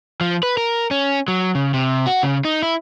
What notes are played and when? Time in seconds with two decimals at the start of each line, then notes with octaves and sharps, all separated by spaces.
0.21 F3
0.43 B4
0.57 A#4
0.91 C#4
1.28 F#3
1.55 C#3
1.74 C3
2.07 F#4
2.23 C#3
2.45 D#4
2.63 E4